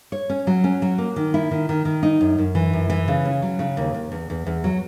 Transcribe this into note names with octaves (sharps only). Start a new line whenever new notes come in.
C#5
C#4
F#3
C#4
F#3
A#3
D#3
E4
D#3
D#3
D#3
D#4
F#2
F#2
E3
F#2
E3
C#3
C#4
F#3
C#3
D#2
D#2
E2
E2
E2
F#3